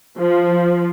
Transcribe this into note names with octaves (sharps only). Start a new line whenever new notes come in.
F3